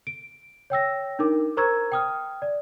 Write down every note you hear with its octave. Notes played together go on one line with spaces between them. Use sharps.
D7
C#5 G5 E6 A#6
D4 D#4 A#4 D6
A#4 C5 A#5 C#6 E6 G#6
G5 D#6 F6
D5